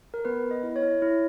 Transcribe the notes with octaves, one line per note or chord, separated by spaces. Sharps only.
A#4
B3 B4
B3
D#5
E4
C#5
E4
E4